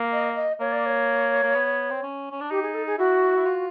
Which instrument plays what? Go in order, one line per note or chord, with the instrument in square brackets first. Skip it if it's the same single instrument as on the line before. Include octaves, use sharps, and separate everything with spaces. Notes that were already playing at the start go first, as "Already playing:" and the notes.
Already playing: [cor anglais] A#3
[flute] D#5
D#5
[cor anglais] A#3 [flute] C#5
[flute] D5
C#5
[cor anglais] A#3
B3
C4
C#4
C#4
D4
[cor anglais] D#4 [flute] G4
[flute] G#4
A4
G#4
[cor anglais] E4 [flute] F#4
[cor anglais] E4
F4